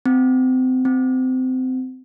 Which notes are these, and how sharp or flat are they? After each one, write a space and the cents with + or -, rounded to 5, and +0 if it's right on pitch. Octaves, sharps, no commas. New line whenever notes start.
C4 -30
C4 -25